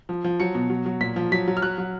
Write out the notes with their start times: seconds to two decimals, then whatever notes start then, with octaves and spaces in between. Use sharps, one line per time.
0.09 F3
0.24 F3
0.40 F#3 C#7
0.55 B2
0.70 F#3
0.86 F#3
1.01 A#2 B6
1.16 F3
1.32 F#3 B6
1.48 F#3
1.57 F6
1.62 F#3 F#6
1.78 F#3